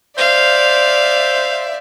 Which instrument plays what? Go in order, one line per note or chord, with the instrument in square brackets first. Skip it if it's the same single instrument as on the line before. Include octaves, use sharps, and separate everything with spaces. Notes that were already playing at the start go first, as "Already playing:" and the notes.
[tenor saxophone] C5 [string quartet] D5 E5 [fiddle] F5